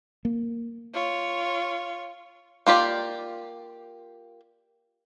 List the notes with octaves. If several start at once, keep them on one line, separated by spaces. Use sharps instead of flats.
A#3
F4 C#5
A#3 F4 G4 D5